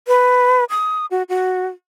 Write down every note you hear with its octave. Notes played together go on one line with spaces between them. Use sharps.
B4
D#6
F#4
F#4